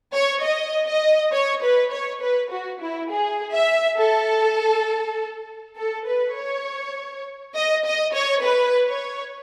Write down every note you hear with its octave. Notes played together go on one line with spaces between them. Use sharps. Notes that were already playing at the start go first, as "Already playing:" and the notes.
C#5
D#5
D#5
C#5
B4
C#5
B4
F#4
E4
G#4
E5
A4
A4
B4
C#5
D#5
D#5
C#5
B4
C#5